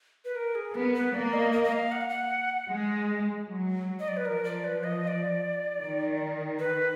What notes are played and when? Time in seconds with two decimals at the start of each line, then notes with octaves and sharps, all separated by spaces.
0.25 B4
0.35 A#4
0.55 G#4
0.75 B3 A#4
0.94 B4
1.14 A#3 D5
1.33 D#5
1.52 D#5
1.64 D#5
1.72 F5
1.92 F#5
2.01 F5
2.09 F#5
2.70 G#3
3.47 F#3
3.99 D#5
4.08 D5
4.17 B4
4.25 F3 A#4
4.44 D5
4.64 B4
4.84 D#5
5.03 D#5
5.08 D5
5.81 D#3
6.59 B4